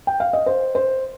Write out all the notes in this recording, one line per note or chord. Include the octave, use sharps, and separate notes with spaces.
G5
F5
D#5
C5
C5